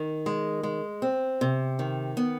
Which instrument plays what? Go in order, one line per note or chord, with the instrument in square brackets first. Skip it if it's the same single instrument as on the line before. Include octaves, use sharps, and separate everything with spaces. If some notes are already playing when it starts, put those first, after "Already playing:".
Already playing: [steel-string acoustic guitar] D#3
G#3
G#3
C4
C3
D#3
B3